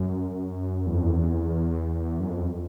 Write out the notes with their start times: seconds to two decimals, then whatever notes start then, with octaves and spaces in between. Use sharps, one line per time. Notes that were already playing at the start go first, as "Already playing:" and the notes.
Already playing: F#2
0.86 E2
0.95 F2
1.03 E2
2.20 F#2
2.30 F2